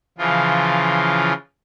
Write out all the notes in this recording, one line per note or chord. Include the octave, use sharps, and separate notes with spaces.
C#3 E3 F3 F4